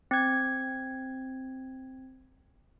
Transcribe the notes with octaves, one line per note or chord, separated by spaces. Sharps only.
C4 G#6